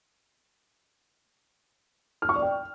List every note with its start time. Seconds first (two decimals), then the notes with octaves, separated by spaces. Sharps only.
2.22 F6
2.29 C#6
2.36 D5
2.42 G5